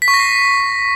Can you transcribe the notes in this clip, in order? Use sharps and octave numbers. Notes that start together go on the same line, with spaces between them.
B6
C#6
A#6
C7